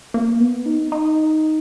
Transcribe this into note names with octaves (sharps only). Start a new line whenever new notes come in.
A#3
B3
D#4
D#4